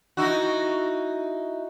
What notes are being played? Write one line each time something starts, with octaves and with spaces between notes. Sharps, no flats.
D#4 E4 F#4